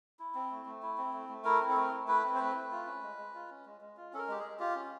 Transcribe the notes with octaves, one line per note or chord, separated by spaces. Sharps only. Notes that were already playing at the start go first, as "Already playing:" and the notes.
E4
C4
A3
A3
E4
C4
A3
A3
E4 A#4
C4
A4
A3 A#4
A3
E4 B4
C4
C5
A3 B4
A3
F4
C#4
G#3
G#3
F4
C#4
G#3
G#3
F4
C#4 A4
A#4
G#3 G4
G#4
G#3
F4 G4
C#4